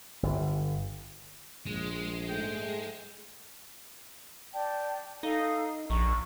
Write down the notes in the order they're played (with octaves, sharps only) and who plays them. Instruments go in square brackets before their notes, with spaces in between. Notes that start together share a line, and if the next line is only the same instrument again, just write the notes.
[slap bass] G1
[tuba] A#1 [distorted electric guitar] G#3
[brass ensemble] G#2 A3 [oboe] G5
[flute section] D5 G5 A5
[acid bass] D#4 [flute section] A4 F5
[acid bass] A#1 [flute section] A#5 C#6